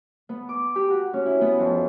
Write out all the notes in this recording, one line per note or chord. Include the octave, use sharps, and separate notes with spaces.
B3
D6
G4
F#4
C#4
E4
B3
F2